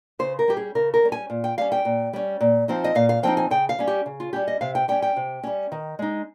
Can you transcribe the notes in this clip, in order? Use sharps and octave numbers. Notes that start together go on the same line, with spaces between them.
C#3 C5
A#4
G3 C#4 G4
G#4
C#3 A#4
A#4
G3 C#4
G#5
A#2
G5
G3 C#4 F5
G5
A#2
G3 C#4
A#2
F3 C4 D#4
D#5
A#2 F5
F5
F3 C4 D#4 G5
G#5
C#3 G5
F5
G3 C#4
G4
C#3
F4
G3 C#4 G4
D#5
C3 F5
G5
G3 C#4 G5
G5
C3
G3 C#4
D#3
G#3 D#4